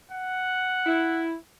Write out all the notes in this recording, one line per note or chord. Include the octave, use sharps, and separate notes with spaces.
F#5
E4